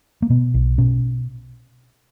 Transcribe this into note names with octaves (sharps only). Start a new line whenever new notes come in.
A#3
B2 B3
B1
B2 C#4